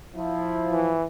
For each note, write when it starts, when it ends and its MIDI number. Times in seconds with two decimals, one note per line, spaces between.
0.15 0.93 53
0.15 0.93 64
0.71 1.07 52